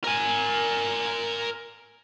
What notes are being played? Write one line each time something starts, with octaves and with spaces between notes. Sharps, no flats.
A#4 G#5